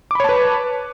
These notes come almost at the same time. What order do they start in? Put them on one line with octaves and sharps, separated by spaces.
D6 B5 C#5 A5 B4